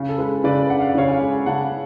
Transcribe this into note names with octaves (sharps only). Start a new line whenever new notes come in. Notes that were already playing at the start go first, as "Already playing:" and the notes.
Already playing: C#3
A4
G#3 B4
C#3 B4 D5
D4 F#5
F5
D5
C#3 C#5 F5
F5 G#5
G#3
C#3 F#5 A5